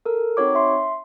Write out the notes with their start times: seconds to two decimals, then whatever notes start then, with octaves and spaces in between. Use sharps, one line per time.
0.06 A4 A#4
0.37 C4 D#4 F#4 C#5 D6
0.55 E5 C6